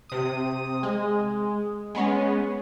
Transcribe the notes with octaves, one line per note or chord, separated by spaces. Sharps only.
C3 D#6
G#3
G#3 B3 C#4